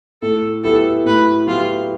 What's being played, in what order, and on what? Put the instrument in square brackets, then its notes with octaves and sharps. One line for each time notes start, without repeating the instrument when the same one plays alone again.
[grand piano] A2 [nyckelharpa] A4
[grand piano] F#3 B3 E4 G4 [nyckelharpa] A4
[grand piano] A2 [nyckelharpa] B4
[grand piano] F#3 B3 E4 G4 [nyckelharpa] F4